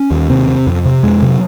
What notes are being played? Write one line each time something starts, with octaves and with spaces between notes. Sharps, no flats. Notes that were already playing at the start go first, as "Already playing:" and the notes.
Already playing: C#4
D#2
C3 C4
C3
F2
C3
F2 G#3
C3 F#3